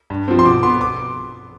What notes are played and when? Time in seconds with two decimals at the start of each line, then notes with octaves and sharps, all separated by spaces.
0.10 G2
0.28 F3 C4
0.39 C6
0.45 B2 D6
0.63 B3 C6
0.81 D6